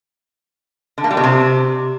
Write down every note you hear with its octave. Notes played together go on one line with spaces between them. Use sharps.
D3
A#3
G3
B2
C3